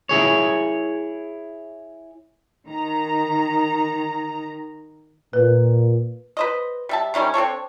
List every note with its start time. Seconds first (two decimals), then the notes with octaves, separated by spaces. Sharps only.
0.09 E4 G#4 C#5
2.67 D#3 A#5
5.33 A#2 B4
6.37 B4 C5 D#5
6.89 G3 E5 A5
7.14 C3 D#3 G3 C#4
7.34 C4 D4 A4 C#5